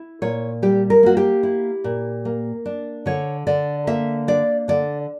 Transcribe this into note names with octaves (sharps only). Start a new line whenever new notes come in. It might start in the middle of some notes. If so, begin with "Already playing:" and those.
Already playing: E4
A#2 C#5
G3 G4
A#4
A#3 F#4
G4
E4
A#2
A#3
D4
D3 C#5
D3 D5
A#3 E5
D4 D5
D3 D5